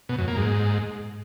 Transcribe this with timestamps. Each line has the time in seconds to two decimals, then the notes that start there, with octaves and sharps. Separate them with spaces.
0.09 B2
0.18 F#2
0.28 A#3
0.37 G#2